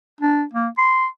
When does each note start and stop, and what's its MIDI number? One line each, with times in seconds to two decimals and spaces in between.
0.21 0.44 62
0.53 0.68 58
0.78 1.07 84